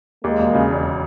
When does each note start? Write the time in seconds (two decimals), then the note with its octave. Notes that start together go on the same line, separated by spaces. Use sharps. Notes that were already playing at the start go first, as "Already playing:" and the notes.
0.24 D#2 G#3 A#3
0.39 E1
0.55 C#3
0.71 E1